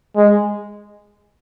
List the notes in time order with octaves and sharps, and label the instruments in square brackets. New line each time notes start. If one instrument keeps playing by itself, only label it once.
[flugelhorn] G#3